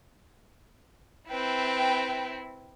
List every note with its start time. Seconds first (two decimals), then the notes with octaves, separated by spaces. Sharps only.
1.30 C4 E4 B4 G5